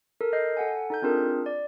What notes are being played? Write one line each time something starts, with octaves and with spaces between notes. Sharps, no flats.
A4 A#4
D#5 G6 C7
A4 F#5 G#5
D#4 A4 G6
C4 D4 F4 G#4 A#4
D5